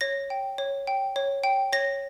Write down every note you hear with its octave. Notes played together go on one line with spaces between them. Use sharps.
C#5 A#6
G5
C#5
G5
C#5
G5
C#5 A#6